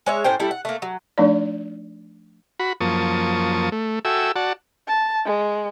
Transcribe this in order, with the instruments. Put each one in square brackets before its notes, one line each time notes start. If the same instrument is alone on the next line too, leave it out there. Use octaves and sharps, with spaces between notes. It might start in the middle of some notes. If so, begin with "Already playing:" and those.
[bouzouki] G#3 C#5 E5
A2 C#4 C5 G5
G3 A3 D4 E4
F#5
A3 A#3
F#3
[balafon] F3 A3 D4 D#4 D5
[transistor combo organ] F#4 B5
F#2 F3 A#3 A5 C#6 D#6
A3
F#4 A4 E5 G5 G#5 E6
F#4 D5 F#5 A5
[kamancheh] A5
G#3